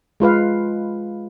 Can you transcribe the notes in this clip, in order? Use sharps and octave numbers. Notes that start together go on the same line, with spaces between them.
G#3 F4 B4 F5